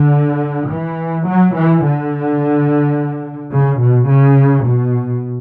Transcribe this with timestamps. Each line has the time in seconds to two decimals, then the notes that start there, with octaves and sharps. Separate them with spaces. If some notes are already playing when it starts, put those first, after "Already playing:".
Already playing: D3
0.70 E3
1.27 F#3
1.55 E3
1.83 D3
3.53 C#3
3.81 B2
4.09 C#3
4.67 B2